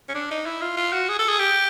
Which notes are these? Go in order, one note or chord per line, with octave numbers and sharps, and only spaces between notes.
C#4
D4
D#4
E4
F4
F4
F#4
G#4
A4
G#4
G4